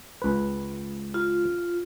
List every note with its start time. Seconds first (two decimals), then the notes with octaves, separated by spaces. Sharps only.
0.22 C#2 B4
1.14 F4